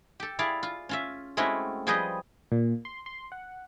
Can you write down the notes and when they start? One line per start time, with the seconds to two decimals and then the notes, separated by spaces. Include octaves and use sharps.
0.20 G4 A4
0.39 E4 G#4 D5 F5
0.63 F4
0.89 C#4 F4 E5
1.37 G#3 A3 C4 C#4 E4 F#4
1.87 F3 G3 G#4 B4 C5 D#5
2.52 A#2
2.85 C6
3.06 C6
3.32 F#5